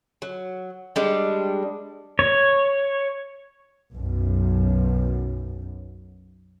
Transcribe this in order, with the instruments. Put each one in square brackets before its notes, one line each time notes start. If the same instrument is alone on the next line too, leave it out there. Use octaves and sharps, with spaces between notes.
[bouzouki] F#3
G3 G#3 D4
[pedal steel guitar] C#5
[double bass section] B1 F#2